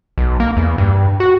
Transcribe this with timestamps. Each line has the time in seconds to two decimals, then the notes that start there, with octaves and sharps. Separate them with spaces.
0.18 B1
0.40 A#3
0.57 E2
0.78 G2
1.20 F#4